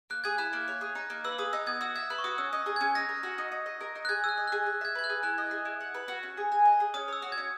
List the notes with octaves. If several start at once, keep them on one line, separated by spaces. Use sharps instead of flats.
A#3 F#6
G#4 G#6
E4 F#6
A#3
C#5
G#4
D#4
A#3
B4 E6
G#4 D#6
D#4 E6
B3 G#6
F#4 E6
E5 G#6
B4 F#6
C#6
F#4 D#6
C#4 E6
D#5
G#4
C#4 G#6
D#4 A#6
A#4
F#4
D#4
D#4
D#5
A#4
D#4
F#6
G#4 G#6
G#5 E6
F#6
D#5
G#4 F#6
G#4
E5 G#6
B4 G#6
F#6
G#4
E4 F#6
D#5
G#4
E4
F#5
B4
F#4
C#4
G#4
G#5
D#5
G#4
C#4 D#6
C#5 E6
F#4
G#6
C#4